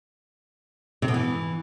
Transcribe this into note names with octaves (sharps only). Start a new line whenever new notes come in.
C3
B2
E3